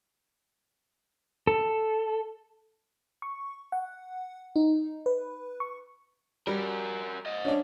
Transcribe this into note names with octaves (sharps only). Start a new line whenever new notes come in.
A4
C#6
F#5
D#4
B4
C#6
G3 F#4 A#4
C5 D#5
C#4 D4